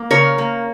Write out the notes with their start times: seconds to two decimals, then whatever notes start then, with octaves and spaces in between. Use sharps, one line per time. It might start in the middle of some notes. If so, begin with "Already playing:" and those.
Already playing: A#3
0.11 C#3 A#4 C#5
0.38 A#3